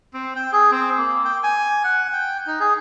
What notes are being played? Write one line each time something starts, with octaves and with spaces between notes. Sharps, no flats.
C4
G5
G#4
C4
A#3
G5
G#5
F#5
G5
D#4
G#4